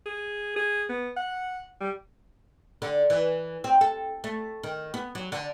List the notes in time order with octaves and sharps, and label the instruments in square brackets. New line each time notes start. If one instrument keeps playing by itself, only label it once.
[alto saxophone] G#4
G#4
B3
F#5
G3
[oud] D3
E3
C4
A4
A3
D#3
B3
F#3
D3